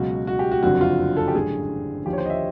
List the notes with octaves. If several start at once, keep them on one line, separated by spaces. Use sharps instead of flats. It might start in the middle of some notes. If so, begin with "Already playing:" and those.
Already playing: C#2 B2 F#3 F#4
F#4
G4
F#4
F#1 F2 D3 F#3 F#4
F4
A4
G4
A1 G2 D3 F#3 G#4
D#2 D3 F3 G4
C#5
C5
D#5
E5